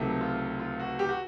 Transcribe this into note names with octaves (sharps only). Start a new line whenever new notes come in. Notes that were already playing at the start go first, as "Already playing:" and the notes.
Already playing: C#2 C3 D#3 F#3 A3
F4
F4
F#4
G4
F#4